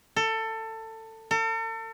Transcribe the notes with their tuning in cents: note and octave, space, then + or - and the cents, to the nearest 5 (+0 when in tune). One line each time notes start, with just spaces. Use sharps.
A4 +20
A4 +40